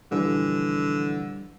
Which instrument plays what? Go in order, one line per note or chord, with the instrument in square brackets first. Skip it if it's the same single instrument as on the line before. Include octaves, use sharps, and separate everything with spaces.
[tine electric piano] A#1 E3 [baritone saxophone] D3 [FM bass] G3